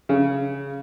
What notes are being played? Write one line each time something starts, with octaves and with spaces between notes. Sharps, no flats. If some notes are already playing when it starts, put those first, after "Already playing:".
C#3